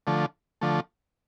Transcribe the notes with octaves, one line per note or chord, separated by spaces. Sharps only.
D3 F3 A3
D3 F3 A3